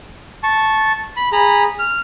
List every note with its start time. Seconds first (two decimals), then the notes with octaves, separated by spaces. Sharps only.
0.43 A5 C#6
1.17 B5
1.32 G#4 A#5 B5
1.79 F6